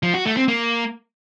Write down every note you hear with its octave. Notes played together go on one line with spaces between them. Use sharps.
F3
F#4
A3
C4
A#3